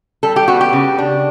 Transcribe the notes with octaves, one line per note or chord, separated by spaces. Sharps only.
G3 A4
G4
B3 F#4
G4
C#3
D4